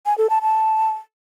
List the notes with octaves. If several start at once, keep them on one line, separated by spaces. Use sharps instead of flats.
G#5
A4
A5
A5